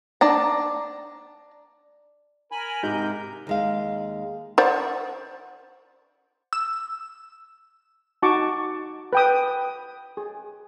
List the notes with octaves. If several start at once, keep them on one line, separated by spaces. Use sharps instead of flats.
D4 A5 A#5
A#4 G#5 B5
G#2 C3 G6
D#2 G#3 F5
C5 D5 F#5
E6
D#4 F#4 A5 C#6 D6
B4 G5 D#6
G#4